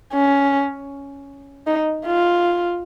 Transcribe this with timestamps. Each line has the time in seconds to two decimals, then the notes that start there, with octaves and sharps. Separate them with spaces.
0.13 C#4
1.67 D#4
2.06 F4